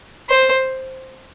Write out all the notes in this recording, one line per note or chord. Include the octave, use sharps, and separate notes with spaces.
C5